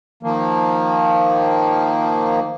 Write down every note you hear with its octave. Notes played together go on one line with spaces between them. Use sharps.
D#3 F3 A#3